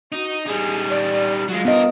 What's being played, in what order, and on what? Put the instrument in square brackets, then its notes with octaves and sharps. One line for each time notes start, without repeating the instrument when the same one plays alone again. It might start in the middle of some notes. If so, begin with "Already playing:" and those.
[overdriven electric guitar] D#4 [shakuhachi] F#4
[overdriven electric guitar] G3 D#4 [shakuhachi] G#4
[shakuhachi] D5
[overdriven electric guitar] F#3 G#3 [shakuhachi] F4
[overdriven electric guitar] G2 A#4 [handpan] B3 D#5